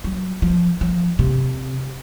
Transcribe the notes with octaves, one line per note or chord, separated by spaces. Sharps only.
F#3
F3
F3
C3